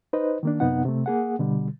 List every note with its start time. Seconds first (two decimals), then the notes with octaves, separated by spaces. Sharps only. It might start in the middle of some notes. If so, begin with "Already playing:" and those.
0.13 D#4 B4 C5 D#5
0.43 D#3 A#3 D4
0.60 F#2 C3 B3 D#4 F#5
0.85 C3 A3
1.06 A#3 G#4 F#5
1.39 B2 D3 G3